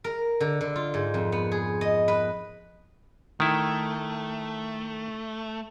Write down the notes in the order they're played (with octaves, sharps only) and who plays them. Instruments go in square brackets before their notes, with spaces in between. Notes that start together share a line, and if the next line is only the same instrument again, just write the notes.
[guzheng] A#4
D3
D3
F4
G#2
F2
B3
G#4
D#5
B4
[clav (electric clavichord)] D#3 E4 [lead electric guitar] A3